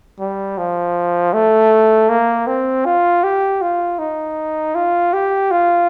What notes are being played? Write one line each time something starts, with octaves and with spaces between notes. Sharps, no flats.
G3
F3
A3
A#3
C4
F4
G4
F4
D#4
F4
G4
F4